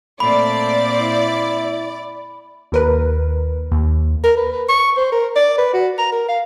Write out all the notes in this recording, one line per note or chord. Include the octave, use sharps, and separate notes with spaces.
A#2 A3 C4 D5 B5
E4
D#2 A#4 B4
D#2
A#4
B4
B4
C#6
C5
A#4
D5
B4
F#4
A#5
A#4
F5